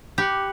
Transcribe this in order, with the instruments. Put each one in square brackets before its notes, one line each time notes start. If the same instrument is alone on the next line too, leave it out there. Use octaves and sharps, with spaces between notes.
[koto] G4 [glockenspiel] B5 D6 F#6 C#7 F#7